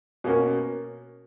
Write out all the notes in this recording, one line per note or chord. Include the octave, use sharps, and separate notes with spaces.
B2 A#3 C#4 F#4 A#4